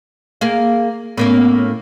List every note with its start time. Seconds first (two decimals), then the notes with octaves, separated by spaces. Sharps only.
0.41 A#3 G#4 F5
1.18 A2 A#3 B3 C#4